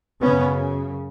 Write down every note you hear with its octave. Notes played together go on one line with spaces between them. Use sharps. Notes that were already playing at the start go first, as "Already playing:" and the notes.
F#2 C#3 B3 C#4